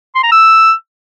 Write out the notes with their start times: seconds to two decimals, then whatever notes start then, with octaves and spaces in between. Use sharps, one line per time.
0.15 C6
0.23 A#5
0.32 E6